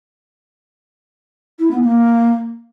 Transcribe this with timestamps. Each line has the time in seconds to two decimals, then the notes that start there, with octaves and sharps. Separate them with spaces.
1.59 E4
1.70 B3
1.82 A#3